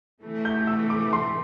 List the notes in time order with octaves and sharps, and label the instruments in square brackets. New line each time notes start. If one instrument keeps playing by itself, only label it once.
[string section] C3 E3 A3
[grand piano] G6
E6
D6
C6